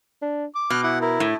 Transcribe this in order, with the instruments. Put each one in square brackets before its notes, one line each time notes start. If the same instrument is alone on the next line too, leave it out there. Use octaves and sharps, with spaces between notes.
[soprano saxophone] D4
D6
[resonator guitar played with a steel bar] B2 [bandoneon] F6 F#6
[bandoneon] E4 F#5
[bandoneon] E4 [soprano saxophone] A#4
[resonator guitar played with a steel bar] A2